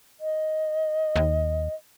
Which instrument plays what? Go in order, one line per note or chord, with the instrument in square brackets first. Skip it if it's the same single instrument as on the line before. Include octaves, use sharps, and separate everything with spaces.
[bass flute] D#5
[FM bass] D#2